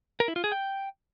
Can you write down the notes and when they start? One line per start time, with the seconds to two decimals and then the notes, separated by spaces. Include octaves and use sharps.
0.20 A#4
0.28 E4
0.36 F4
0.44 G#4
0.52 G5